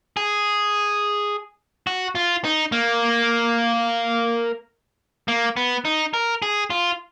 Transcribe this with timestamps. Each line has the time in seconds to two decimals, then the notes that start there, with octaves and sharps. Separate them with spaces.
0.17 G#4
1.87 F#4
2.15 F4
2.44 D#4
2.72 A#3
5.28 A#3
5.57 B3
5.85 D#4
6.14 A#4
6.42 G#4
6.70 F4